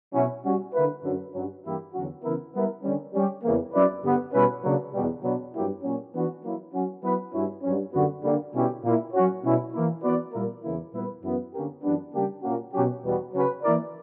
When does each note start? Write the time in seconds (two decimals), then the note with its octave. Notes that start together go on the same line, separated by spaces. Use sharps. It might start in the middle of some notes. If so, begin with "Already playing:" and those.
0.13 B2 F#3 C#4 E4
0.43 G3 C#4 F#4
0.73 D3 A#3 E4 B4
1.04 F#2 D3 F#3
1.33 G2 F#3 C#4
1.63 G2 E3 A#3 E4 G4
1.93 E2 D3 F#3 C#4 F#4
2.23 C#3 E3 B3 E4 A#4
2.54 G3 B3 E4 A#4
2.83 D3 G3 C#4
3.13 G3 C#4 G4
3.43 E2 C#3 E3 A#3
3.73 F#3 C#4 E4 B4 D5
4.03 G2 D3 G3 B3
4.33 B2 G3 C#4 E4 B4
4.63 C#3 F#3 A#3 D4
4.92 E2 B2 G3
5.23 B2 F#3 B3 D4
5.53 G2 F#3 A#3 E4 G4
5.83 A#2 F#3 C#4
6.13 E3 B3 D4 F#4
6.43 F#3 A#3 E4
6.73 F#3 C#4 F#4
7.02 F#3 B3 E4 B4
7.33 G2 F#3 C#4 E4
7.63 G2 F#3 C#4
7.93 F#2 D3 G3 B3 F#4
8.23 D3 G3 A#3
8.53 B2 G3 C#4 E4 G4
8.83 A#2 A#3 E4
9.13 F#3 C#4 F#4 C#5
9.43 B2 G3 C#4 E4
9.73 E3 A#3 E4
10.03 E3 B3 F#4 B4 D5
10.33 A#2 G3 A#3 E4 A#4
10.63 E2 C#3 E3 A#3 E4
10.93 A#2 G3 B3 E4 B4
11.23 F#2 E3 B3
11.53 D3 A#3 C#4 G4 A#4
11.83 F#2 E3 G3 B3 D4
12.13 C#3 G3 A#3 D4 G4
12.42 A#2 A#3 C#4 F#4
12.73 B2 F#3 C#4 G4
13.03 E2 B2 G3 B3 F#4
13.33 C#3 F#3 C#4 F#4 B4
13.63 E3 A#3 E4 A#4 D5